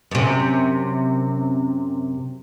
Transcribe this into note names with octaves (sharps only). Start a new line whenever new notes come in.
F#2 C3